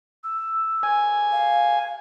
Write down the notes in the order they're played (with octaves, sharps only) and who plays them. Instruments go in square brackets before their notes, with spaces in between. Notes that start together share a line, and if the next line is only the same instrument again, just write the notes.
[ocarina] E6
[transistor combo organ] G#5
[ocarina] F5